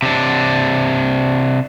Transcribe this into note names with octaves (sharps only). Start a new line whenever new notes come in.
C3 D4